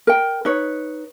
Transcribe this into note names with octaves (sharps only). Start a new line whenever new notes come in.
A#4 G5
D#4 B4 C#5